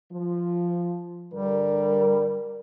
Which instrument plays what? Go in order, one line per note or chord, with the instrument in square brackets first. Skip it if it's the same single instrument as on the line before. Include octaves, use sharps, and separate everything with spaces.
[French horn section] F3
[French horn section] G2 D3 A#4 [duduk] G3